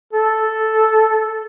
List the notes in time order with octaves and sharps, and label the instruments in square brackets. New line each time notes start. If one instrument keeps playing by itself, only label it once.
[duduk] A4